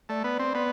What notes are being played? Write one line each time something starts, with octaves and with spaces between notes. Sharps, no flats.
A3 D5
B3
C4
B3